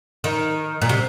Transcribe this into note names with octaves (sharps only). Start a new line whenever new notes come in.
D#3
A#2
C3